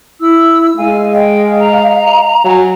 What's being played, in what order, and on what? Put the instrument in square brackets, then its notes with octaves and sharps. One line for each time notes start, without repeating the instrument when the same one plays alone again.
[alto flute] E4 [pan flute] E6
[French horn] G#3 [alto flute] F5 [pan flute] G#5
[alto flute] D#5 [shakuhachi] F5 [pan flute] G5
[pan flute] A#5
[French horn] F#3 [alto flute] G#5